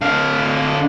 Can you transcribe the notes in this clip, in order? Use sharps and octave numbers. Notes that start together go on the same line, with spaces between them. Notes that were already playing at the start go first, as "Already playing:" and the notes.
D3 F5